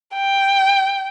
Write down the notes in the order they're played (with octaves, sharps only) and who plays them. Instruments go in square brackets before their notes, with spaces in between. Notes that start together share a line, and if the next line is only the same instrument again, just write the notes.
[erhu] G5